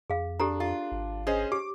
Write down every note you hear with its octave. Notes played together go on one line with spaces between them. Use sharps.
F2 G#4 F5
D4 G4 A4 A#5
F4
G#1
C#4 G#4 C5 D#5
G4 D6